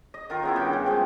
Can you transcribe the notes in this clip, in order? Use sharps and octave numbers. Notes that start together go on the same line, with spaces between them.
D#5
D#3 F4 A#4
C#3 B3 E4
G2 D#3 G5
C#3
F3 G#3